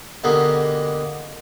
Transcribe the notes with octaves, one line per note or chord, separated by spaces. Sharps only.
B2 D3 A#3 G4 G#4